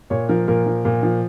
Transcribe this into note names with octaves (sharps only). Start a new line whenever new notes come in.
A#2 C#5
F3 A#4
A#2 A#4
F3
A#2
F3